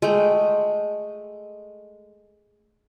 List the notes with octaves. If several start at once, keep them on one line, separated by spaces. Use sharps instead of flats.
G#3 A3 G5